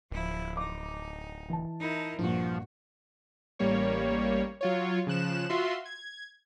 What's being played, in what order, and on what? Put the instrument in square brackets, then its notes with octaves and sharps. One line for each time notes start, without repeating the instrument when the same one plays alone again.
[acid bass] D1 [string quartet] F3 E4
[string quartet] D#4 [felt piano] D6
[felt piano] E3 A5
[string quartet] D#4 E4 A#4
[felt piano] A#1 A#2 [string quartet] G2 F#4 [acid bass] F3
[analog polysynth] A1 G3 A#3 C#5
F#3 F4 C#5
C#3 F3 F#6 E7
F4 F#4 E5 C6
G#6